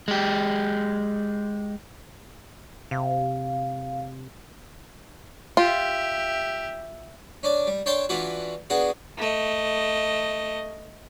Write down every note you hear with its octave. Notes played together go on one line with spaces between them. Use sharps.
G#3 G4
C3 F5
F4 G4 E5
C#4 D4 D5
G3
D4 C#5 G5 A5 C6
E3 D4 F4 F#4 B4
B3 D4 F#4 G#4
A3 D#5